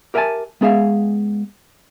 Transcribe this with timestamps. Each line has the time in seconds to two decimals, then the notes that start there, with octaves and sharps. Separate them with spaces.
0.14 G4 A#4 E5 F5 G#5 A5
0.61 G#3 B3 G#4 E5 F5